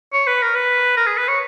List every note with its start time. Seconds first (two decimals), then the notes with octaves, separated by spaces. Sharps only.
0.13 C#5
0.27 B4
0.42 A#4
0.55 B4
0.97 A#4
1.07 G#4
1.17 B4
1.28 C#5